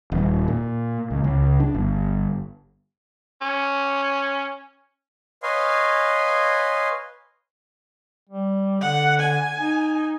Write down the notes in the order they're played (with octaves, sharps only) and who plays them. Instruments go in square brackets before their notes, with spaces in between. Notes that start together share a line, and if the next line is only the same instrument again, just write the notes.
[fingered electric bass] D#1
A#2
C#2
C#2
D4
G1
[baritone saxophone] C#4
[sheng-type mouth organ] B4 C#5 D#5 F5 G#5 C6
[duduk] G3
[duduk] D3 [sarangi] F#5
[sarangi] G#5
[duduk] D#4